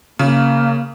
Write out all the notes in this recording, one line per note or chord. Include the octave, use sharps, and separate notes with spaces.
C#3 A#3